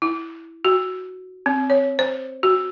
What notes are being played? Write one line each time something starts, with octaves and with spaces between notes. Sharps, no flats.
E4
F#4
C4
C#5
C5
F#4